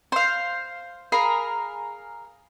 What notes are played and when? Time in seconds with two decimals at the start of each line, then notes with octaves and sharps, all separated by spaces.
0.12 C5 F5 C6
1.12 G#4 A#4 F5 B5